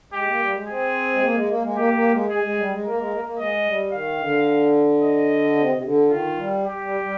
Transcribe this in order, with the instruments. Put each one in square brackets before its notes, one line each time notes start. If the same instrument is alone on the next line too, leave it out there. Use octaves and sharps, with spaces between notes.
[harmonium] G#3 [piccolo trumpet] G4
[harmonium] A#3
G3
G#3
[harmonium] C4 [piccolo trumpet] G#4
[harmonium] G#3
A#3
G#3
A#3
G#3
[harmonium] A#3 [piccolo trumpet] G4
[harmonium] A#3
G#3
[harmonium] G#3 [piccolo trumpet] G#4
[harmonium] G#3
G3
G#3
[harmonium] A#3 [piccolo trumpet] A#4
[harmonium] G#3
A#3
A#3
[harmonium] G#3 [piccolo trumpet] D#5
[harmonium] G3
[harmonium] D#3 [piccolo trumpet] F5
[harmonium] D3
[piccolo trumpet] D#5
[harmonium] C3
C3
D3
[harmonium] D#3 [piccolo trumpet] F4
[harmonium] G3
[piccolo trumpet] G4
[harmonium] G3
G3